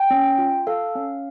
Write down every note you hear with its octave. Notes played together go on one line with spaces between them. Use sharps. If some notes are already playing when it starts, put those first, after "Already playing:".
Already playing: G5
C#4
F4
A4 F5
C#4